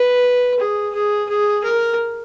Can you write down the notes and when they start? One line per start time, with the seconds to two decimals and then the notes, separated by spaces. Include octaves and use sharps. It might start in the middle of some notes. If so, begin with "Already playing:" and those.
Already playing: B4
0.59 G#4
0.94 G#4
1.29 G#4
1.64 A#4